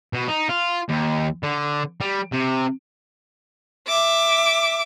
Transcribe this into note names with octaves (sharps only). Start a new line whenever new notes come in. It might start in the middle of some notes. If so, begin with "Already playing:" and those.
B2
D#4
F4
D#2
D3
G3
C3
E5 D6